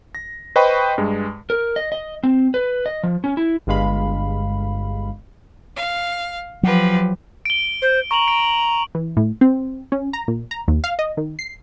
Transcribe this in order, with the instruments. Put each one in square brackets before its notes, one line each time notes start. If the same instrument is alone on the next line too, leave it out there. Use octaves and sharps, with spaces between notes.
[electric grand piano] A#6
B4 C5 D#5 G5 B5 C#6
G2 G#3
[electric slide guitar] A#4
D#5
D#5
C4
B4
D#5
F3
C#4
E4
[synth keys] G1 G2 G#3 F5 B5
[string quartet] F5
[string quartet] F3 G4 B4 [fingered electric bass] F#3
[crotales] D7 G7
[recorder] C5
[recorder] A#5 [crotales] C#6 F#7
[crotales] D7
[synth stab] E3
A2
C4
C#4
A#5
A#2
A#5
D#2
F5
D#5
D#3
C7